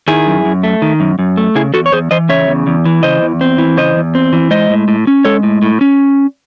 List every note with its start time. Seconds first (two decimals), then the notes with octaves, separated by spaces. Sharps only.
0.08 D#3 E4 G#4
0.27 F#2
0.45 F#2
0.63 A3
0.82 D#3
1.00 F#2
1.19 F#2
1.37 A3
1.55 C#3 E4 G#4
1.74 E2 F#4 A4
1.86 C#5
1.92 E2 G#4 C5
2.11 E3 C5 D#5
2.29 C#3 C#5 E5
2.48 E2
2.67 E2
2.86 E3
3.03 C#3 C5 D#5
3.22 E2
3.41 C4
3.58 E3
3.77 C#3 C5 D#5
3.96 E2
4.15 C4
4.33 E3
4.51 G#3 C5 D#5
4.70 A2
4.88 A2
5.07 C#4
5.25 G#3 A4 C#5
5.43 A2
5.62 A2
5.81 C#4